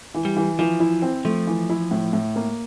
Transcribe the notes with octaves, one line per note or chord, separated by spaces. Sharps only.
E3
G3
E3
E3 F3
E4
C4
F3 A3
E3
E4
A2
A2
A#3